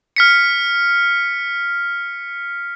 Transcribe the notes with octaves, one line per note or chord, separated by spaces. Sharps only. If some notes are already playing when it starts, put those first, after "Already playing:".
F6 B6 C#7